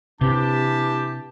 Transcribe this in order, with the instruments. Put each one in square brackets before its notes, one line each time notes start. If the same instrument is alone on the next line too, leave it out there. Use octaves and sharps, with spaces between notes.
[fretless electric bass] C3 [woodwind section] E3 D4 G4 [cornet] A5